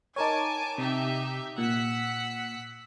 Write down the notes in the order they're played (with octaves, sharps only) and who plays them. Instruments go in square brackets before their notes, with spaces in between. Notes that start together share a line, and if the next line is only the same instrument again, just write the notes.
[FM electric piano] D#4 A#4 C#5 [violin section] G#5 A5 D6
[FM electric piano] C3 [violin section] D#4 G4 E5
[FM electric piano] A#2 [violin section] F#5 E6 B6